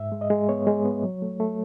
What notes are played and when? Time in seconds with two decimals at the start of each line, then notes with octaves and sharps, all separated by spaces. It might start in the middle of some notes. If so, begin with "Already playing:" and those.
Already playing: G#2 E5
0.12 G#3
0.21 D#5
0.30 G#3
0.49 B3 C#5
0.67 G#3
0.85 B3
1.03 F#3
1.22 A3
1.40 A3